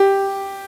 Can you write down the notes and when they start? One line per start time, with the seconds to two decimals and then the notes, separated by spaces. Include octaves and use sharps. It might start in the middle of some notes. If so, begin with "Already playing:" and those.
Already playing: G4